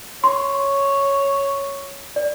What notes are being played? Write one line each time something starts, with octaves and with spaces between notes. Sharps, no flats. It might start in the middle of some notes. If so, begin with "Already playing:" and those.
C#5 C6
D5